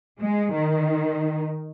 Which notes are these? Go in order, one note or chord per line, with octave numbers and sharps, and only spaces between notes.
G#3
D#3